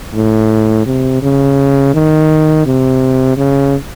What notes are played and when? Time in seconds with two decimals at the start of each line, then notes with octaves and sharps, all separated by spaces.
0.15 A2
0.86 C3
1.23 C#3
1.94 D#3
2.66 C3
3.37 C#3